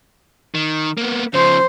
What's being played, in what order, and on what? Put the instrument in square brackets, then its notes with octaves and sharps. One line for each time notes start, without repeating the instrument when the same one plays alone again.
[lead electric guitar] D#3
A#3 B3
[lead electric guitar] C#3 F3 [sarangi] C5